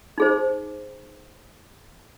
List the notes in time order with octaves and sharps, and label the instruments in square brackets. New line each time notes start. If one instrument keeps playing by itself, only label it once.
[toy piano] D#4 G#4 C5